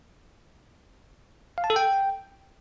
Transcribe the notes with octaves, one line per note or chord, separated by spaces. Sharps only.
F5
A5
A4
G5